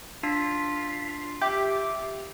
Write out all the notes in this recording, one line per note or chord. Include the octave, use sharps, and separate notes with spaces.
D4 F4 B6
G4 E5 D6